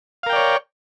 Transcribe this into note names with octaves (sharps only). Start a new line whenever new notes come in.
A#4 C#5 D5 F5 G5